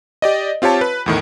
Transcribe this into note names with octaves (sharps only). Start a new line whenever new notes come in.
G4 D5 D#5
C4 F4 G4 C#5 A5
B4
E2 A2 D#3